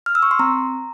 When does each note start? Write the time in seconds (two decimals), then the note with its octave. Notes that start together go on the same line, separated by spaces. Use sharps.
0.06 F6
0.15 E6
0.23 C#6
0.31 C6
0.39 C4 A#5